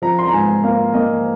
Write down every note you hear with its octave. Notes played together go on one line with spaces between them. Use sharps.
F3 A#5
C6
A#5
G#2 G#5
A#3 F5
A#3 D#5